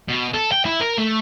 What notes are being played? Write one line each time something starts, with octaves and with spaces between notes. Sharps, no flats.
B2
A4
G5
E4
A#4
A3